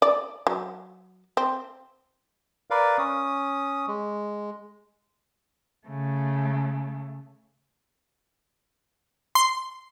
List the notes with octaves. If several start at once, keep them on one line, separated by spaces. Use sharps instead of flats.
D5
F#3
C4
A#4 B4 D5 F5
C#4 D#6
G#3
C#3 A3
C6